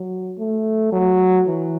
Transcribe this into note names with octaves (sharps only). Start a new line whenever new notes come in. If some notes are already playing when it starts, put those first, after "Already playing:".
Already playing: F#3
A3
F#3
E3